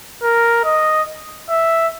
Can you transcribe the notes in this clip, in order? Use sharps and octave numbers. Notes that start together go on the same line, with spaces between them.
A#4
D#5
E5